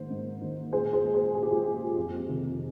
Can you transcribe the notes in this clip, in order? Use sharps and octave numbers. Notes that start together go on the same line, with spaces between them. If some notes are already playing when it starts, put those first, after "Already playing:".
Already playing: G#2 D#3 A#3 C5
G#2
D#3 A#3
A#2 G#4 C5
G#4 C5
G#3
G#4 C5
A#2 G#4
G4
F4 G#4
G#3
F2
C3 D#3